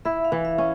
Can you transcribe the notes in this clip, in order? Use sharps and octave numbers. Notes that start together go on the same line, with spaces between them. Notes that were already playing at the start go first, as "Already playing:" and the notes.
E4 E5
F5
E3
E5
C#4